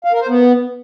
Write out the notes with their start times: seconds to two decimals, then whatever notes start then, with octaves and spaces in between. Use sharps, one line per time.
0.04 F5
0.12 A#4
0.20 C5
0.28 B3